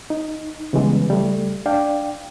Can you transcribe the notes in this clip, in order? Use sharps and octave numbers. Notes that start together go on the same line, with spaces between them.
D#4
C#3 E3 G3 G#3 B3
C#2 G3 A3
D4 D5 F5 G5